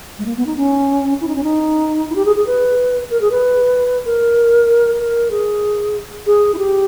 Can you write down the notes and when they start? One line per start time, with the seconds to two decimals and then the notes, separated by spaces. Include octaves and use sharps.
0.19 G#3
0.26 A#3
0.37 B3
0.46 D#4
0.57 C#4
1.21 E4
1.28 D#4
1.36 C#4
1.43 D#4
2.10 E4
2.15 G4
2.25 G#4
2.36 G#4
2.47 B4
3.10 A#4
3.21 G#4
3.31 B4
4.05 A#4
5.00 A#4
5.31 G#4
6.26 G#4
6.54 E4
6.58 G4